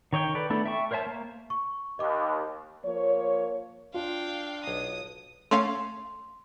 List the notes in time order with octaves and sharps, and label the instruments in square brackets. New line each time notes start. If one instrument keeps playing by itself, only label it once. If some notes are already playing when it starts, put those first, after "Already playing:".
[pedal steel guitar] D#3 C#5 D#5 G5
A4 B4 D5
A3 B3 D4 E4 A4
E5 G5 A5 C#6
A#4 C5 C#5 E5 A5
A#3
[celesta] C#6
[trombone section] D#2 [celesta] D#5 D6
[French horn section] F3 A#3 C#5
[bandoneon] D4 [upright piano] F4 [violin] F5 G5
[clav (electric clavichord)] B1 A#5 [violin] D#6
[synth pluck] A3 C#4 F5 [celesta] C6